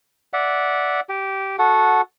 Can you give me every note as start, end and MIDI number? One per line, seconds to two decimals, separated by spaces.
0.33 1.00 74
0.33 1.00 76
0.33 1.00 78
1.09 1.56 67
1.59 2.01 66
1.59 2.01 69
1.59 2.01 78